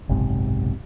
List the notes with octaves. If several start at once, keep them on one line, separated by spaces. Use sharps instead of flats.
F#1 B1 G#2 C3